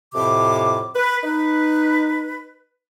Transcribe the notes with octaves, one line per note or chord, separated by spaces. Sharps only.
F2 A2 C3 D6
B4
D#4 B4